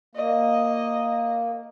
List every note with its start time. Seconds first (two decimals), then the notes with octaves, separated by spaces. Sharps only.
0.15 A#3 D#5